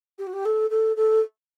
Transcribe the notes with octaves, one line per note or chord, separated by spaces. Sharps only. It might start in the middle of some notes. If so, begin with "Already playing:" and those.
G4
F#4
G4
A4
A4
A4